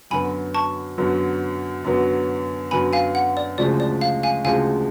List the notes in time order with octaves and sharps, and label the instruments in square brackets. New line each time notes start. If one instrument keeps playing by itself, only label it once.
[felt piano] F#2 D3 F#3 B3 [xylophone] G#5 B5
[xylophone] A5 C#6
[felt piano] F#2 D3 F#3 B3
F#2 D3 F#3 B3
[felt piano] F#2 D3 F#3 B3 [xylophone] G#5 B5
[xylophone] F5 G#5
F#5
D5
[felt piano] D2 C#3 F3 G#3 [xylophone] D5
[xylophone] D5
F5
F5 G#5
[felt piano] D2 C#3 F3 G#3 [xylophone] F5 G#5